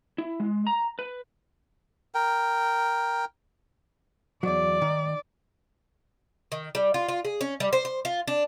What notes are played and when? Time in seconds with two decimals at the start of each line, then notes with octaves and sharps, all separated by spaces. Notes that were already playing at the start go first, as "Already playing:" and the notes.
0.18 E4
0.40 G#3
0.67 A#5
0.99 B4
2.15 A#4 G5
4.43 E2 F#3 D5
4.82 D#3
6.52 D#3
6.75 G3
6.94 F4
7.08 F4
7.25 G#4
7.41 C#4
7.60 G3
7.73 C5
7.85 C5
8.05 F4
8.28 D4